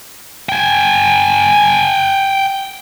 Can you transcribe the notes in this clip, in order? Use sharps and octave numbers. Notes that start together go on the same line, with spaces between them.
G5 G#5